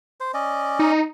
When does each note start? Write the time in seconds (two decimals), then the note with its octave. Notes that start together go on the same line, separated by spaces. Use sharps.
0.20 C5
0.34 C#4 D5 D#5
0.79 D#4